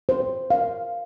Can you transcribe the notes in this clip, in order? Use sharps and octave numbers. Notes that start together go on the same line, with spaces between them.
C5
F5